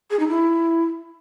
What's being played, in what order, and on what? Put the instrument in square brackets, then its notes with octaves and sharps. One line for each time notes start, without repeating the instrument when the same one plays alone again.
[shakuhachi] G#4
D#4
E4